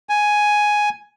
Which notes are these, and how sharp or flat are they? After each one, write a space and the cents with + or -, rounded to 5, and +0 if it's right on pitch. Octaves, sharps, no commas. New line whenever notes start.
G#5 +5